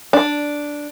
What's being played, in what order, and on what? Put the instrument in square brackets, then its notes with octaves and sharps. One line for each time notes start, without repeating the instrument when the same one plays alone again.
[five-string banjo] D4